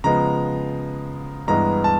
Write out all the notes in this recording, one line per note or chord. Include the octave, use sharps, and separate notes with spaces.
C#3 F3 G#3 B3 A#5
G2 E3 G#3 B3 A#5
A5